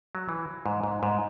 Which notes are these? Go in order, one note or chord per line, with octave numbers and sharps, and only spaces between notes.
F#3
E3
G#2
G#2
G#2